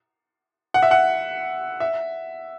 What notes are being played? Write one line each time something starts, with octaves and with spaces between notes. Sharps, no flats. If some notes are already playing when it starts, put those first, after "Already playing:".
F#5
E5
F#5
E5